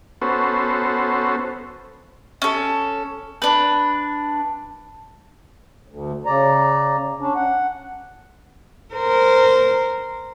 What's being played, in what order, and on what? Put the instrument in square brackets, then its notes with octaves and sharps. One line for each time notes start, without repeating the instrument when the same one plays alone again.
[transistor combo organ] B3 C#4 F#4 A4 C5
[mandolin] C#4 A4
D4 B4
[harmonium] D2
C#3 D5 A#5
C#4 D4
F#5
[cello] A#4 C5